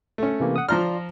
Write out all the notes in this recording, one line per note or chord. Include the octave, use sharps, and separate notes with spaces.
A3 C#4
C3 E3 A#3
F#5 D#6
F3 F4 D5 A#5 C6 F6